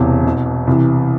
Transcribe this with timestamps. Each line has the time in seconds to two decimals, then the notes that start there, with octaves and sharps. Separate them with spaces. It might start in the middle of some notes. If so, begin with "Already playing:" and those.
Already playing: E1 E2 C3
0.25 C2 B2
0.67 C2 C3 E3